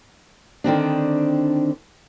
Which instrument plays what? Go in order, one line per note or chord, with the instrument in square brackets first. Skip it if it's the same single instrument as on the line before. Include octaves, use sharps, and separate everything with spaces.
[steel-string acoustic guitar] D3 D#3 C4 D4